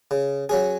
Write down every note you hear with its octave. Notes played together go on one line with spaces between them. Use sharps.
C#3
F#3 C#4 G#4